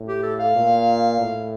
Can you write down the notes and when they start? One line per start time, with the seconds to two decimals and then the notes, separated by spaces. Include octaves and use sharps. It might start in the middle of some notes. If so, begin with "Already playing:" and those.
Already playing: A2
0.08 G4
0.23 A4
0.40 F5
0.55 A#2
1.20 A2